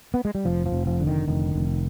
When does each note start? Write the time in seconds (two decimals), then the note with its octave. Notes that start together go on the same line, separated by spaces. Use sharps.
0.14 B3
0.25 G#3
0.35 G3
0.45 F1 F3
0.66 F3
0.72 F1
0.87 F3
1.00 D3
1.07 D#3
1.28 F1 D#3
1.56 F1